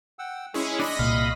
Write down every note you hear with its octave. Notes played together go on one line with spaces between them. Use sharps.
F#5 G5 E6
G#3 C#4 E4 G#4 E5 C#6
D4 D#5 B5 A#6
C2 A#2 F5